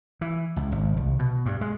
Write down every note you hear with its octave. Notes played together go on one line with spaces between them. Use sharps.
E3
C#2
G#1
C2
B2
G2
G#3